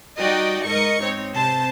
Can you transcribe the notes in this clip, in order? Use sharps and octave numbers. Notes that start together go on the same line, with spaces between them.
G3 D#4 F#4 D5 D#5 G5
G#2 A#4 D#5 C#6 C#7
C4 D#4 C#5
C3 C5 A5